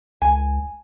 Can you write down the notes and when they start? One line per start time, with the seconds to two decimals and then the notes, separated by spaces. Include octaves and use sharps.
0.22 C#2 G#5